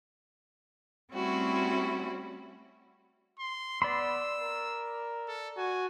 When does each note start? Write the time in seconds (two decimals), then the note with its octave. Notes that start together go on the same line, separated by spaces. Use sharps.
1.13 G3 A3 C4 C#4 E4 F#4
3.39 C6
3.82 B3 D5 B5 C6 E6
4.39 A#4
5.28 A4
5.57 F#4 G#5